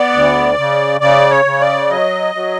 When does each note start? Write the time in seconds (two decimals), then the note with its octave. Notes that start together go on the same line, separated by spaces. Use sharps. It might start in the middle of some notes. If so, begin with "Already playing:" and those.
Already playing: B3 D5
0.13 D2
0.57 C#3
1.01 C#3 D5
1.31 C#5
1.45 C#3
1.60 D5
1.89 F#3 D#5
2.35 F#3